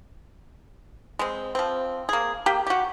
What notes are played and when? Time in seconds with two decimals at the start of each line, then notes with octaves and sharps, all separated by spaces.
1.19 G#3 C4
1.55 F3 C4
2.09 A#3 G#4
2.46 A#3 G4 G5
2.67 F#4 G4